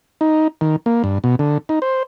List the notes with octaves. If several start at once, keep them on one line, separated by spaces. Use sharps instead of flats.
D#4
D#3
A#3
G2
B2
D3
D#4
C5